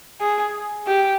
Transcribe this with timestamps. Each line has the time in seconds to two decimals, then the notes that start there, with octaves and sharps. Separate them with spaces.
0.20 G#4
0.87 G4